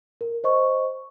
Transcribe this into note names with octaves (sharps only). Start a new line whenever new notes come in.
A#4
C5 D#5 C#6